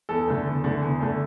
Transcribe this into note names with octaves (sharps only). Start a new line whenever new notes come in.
E2 A4
D3 A3
E2
D3 A3
E2
D3 A3